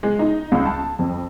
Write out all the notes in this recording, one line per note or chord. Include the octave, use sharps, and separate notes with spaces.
G#3
D#4
C#2
A5
F2